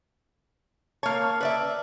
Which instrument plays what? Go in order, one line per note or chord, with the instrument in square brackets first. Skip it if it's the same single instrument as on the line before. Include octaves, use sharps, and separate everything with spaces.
[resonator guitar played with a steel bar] A#3 C#5 [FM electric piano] A5 F6
[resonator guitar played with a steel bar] B4 D5 E5